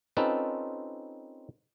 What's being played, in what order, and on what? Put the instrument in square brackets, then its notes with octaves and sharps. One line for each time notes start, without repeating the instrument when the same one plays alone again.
[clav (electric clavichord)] C4 C#4 D#4 F4 A4 B4